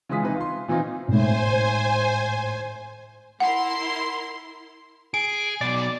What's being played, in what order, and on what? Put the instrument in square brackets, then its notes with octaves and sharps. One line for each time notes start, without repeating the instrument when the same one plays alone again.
[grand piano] C#3 E3 G#3 F4 D#6 B6
C3 E3 D#4 B4
F4 C6
A#2 E3 C4 D#4 F4
[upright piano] G#1 A2 [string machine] C5 G#5
[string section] E4 A#4 C6 [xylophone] F#5
[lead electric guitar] G#4 [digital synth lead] D7
[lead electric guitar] B2 F#3 [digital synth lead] D5